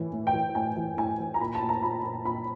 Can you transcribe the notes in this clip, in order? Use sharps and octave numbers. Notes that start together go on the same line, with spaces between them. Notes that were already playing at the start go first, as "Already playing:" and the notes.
Already playing: A2 E3
A2
G5
E3
A2 G#5
E3
A2 G#5
E3
A#5
A#2 B5
A5
A#2
A#5
A#2 B5
A#2
A#2 B5